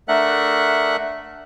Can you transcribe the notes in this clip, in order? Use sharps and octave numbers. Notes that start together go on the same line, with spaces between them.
A3 D4 A#4 E5 F#5 F#6